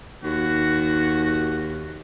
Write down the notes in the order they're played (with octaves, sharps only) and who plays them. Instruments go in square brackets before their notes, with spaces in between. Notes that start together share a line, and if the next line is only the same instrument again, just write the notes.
[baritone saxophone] D#2 [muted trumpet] F#4